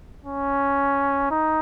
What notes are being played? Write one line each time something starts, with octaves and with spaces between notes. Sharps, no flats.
C#4
D#4